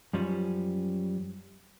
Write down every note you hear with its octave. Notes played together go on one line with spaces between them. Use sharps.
F#2 F3 G3 C#4